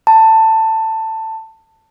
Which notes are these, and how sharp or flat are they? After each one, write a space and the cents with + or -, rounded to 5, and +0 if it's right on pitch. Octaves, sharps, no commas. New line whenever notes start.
A5 +15